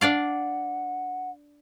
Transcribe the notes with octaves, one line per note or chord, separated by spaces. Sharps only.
D4 D5 F5 F#5